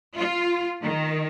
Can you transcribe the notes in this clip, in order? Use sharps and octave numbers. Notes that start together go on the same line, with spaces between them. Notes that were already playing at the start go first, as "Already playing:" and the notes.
F4
D#3